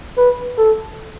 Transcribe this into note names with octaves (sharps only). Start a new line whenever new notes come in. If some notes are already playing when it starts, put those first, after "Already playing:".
B4
A4